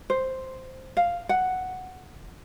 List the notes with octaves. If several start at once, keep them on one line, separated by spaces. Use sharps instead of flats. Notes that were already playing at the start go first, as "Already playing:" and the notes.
C5
F5
F#5